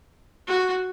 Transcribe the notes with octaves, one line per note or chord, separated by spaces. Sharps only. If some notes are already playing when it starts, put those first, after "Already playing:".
F#4